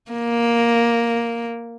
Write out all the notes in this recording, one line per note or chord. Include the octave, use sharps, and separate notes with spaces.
A#3